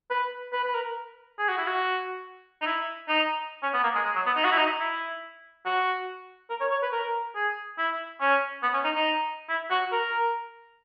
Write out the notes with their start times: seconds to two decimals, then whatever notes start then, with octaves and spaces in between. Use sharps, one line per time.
0.10 B4
0.53 B4
0.64 B4
0.75 A#4
1.38 G#4
1.48 F#4
1.58 E4
1.67 F#4
2.61 D#4
2.66 E4
3.08 D#4
3.63 C#4
3.73 B3
3.83 A#3
3.95 G#3
4.05 G#3
4.15 F#3
4.26 B3
4.36 D#4
4.44 F#4
4.52 E4
4.58 D#4
4.80 E4
5.65 F#4
6.50 A#4
6.60 C#5
6.71 C#5
6.82 B4
6.92 A#4
7.35 G#4
7.78 E4
8.21 C#4
8.63 B3
8.74 C#4
8.84 D#4
8.95 D#4
9.49 E4
9.70 F#4
9.92 A#4